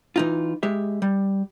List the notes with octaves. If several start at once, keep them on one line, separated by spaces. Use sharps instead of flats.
E3 D#4 F4
G#3 G4 E5
G3